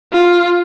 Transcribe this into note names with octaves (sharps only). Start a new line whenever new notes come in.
F4